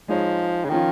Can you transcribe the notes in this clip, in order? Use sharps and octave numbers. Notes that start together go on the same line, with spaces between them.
F3 G#3 D#4 C#5
C#3
D#3 F3 C#4 F4